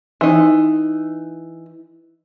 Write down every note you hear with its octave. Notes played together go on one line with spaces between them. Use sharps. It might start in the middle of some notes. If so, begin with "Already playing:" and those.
E3 D#4